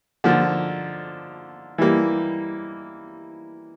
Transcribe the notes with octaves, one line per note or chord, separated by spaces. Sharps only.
D3 F3 A#3
E3 G3 A#3